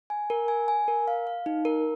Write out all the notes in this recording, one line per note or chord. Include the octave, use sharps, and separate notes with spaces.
G#5
A#4
G#5
G#5
A#4
F5
F5
D#4
A#4